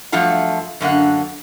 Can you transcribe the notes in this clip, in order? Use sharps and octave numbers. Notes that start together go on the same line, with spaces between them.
G2 F3 F#3 A3 F4 F#5
F#2 D3 A#3 F#5